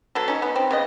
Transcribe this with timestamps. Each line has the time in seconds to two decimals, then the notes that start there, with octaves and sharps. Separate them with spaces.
0.15 F#3 B3 A4
0.28 C#4 D#4
0.42 B3
0.56 C4
0.71 C#3 B3 D#5